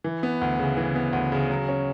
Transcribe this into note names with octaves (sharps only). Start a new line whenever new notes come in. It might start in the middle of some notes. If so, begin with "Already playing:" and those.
E3
B3
D2
C#3
E3
B3
D2
C#3
F#3
C#4